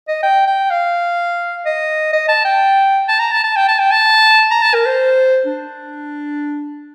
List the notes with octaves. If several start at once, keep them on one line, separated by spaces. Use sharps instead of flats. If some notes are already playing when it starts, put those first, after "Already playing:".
D#5
G5
G5
F5
D#5
D#5
A5
G5
A5
A#5
A5
A5
G5
A5
G5
A5
A#5
A5
A#4
C5
D4